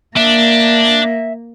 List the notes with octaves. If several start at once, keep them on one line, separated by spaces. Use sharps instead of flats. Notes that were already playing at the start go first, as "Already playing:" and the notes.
A#3 D4 E5